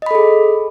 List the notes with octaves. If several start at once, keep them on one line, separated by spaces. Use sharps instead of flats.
G#4 A4 D#5 B5